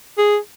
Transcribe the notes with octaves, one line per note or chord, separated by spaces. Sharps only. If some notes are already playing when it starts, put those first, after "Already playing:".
G#4